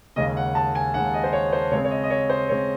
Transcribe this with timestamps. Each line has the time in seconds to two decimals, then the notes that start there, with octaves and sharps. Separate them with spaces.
0.16 D#2 C#3 G#3 D#5
0.37 F#5
0.55 A5
0.75 G#5
0.94 D#2 C#3 G#3 F#5
1.14 D#5
1.24 C5
1.33 C#5
1.53 C5
1.72 C#3 G#3 C4 C#5
1.85 C#5
1.91 D#5
2.04 D#5
2.10 C#5
2.30 C5
2.49 C#3 G#3 C4 C#5